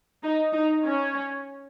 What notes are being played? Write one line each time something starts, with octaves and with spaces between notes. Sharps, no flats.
D#4
D#4
C#4